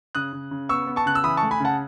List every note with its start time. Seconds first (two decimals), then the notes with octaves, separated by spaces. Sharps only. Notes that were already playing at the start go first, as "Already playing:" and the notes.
0.15 C#3 D#6 F#6
0.33 C#3
0.51 C#3
0.69 B3 C#6 E6
0.87 B3
0.96 A5 C#6
1.06 C#3 F#6
1.15 E6
1.24 E3 B5 D#6
1.37 A5 C#6
1.42 A3
1.51 G#5 B5
1.60 C#3 F#5 A5